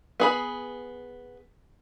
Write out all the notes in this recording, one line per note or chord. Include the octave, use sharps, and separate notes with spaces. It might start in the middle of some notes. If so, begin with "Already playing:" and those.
B3 G#4 B5